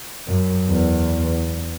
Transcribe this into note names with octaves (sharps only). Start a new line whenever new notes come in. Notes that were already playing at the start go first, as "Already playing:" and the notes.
F#2
E2